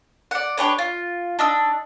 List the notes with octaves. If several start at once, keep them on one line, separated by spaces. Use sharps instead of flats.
D5 F#5
D4 G4 B4 C#5
F4
D4 D#4 E6